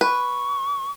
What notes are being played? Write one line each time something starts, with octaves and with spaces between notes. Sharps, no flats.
B4 C#6